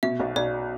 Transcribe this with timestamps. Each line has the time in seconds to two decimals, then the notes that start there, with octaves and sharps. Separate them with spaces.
0.03 B2 E5
0.20 B1
0.36 B1 D5